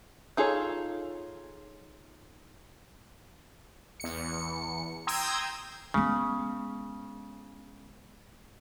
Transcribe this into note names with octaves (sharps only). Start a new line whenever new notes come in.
D#4 F4 G#4 A4 C#5
E2 C#7
G5 A#5 C6 D#6 E6 G#6
C#3 G#3 B3